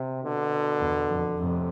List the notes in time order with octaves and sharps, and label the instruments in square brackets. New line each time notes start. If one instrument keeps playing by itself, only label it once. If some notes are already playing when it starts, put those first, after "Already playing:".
Already playing: [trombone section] C3
B2 D3
[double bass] E2
F2
[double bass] F2 [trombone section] A2 C3